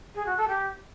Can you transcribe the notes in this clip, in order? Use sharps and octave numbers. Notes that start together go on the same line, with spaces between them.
G#4
F#4
A4
G4